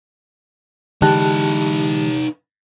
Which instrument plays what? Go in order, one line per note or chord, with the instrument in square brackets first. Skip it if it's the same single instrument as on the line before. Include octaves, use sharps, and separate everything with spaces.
[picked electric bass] D3 E3 G#3 [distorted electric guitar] D#4 B4 [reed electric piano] G4 A5 F#6